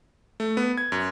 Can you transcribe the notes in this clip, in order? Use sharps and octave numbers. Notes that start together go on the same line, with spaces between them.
A3
B3
G#6
F#2